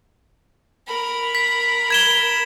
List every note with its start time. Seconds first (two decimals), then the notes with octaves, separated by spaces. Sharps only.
0.87 A#4 B5
1.35 B6
1.90 G#6 E7 G7